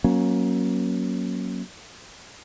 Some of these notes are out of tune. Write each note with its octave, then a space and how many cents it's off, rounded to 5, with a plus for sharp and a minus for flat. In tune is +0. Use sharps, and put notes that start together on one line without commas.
F#3 +0 A#3 +25 C#4 +0